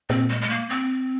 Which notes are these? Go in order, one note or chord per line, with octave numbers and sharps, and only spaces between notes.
A#2 C4
G#3
G#3
A#3
C4